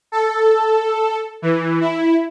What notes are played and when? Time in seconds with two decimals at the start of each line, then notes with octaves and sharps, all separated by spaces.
0.12 A4
1.42 E3
1.81 E4